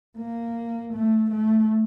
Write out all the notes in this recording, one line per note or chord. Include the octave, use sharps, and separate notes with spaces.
A#3
A3
A3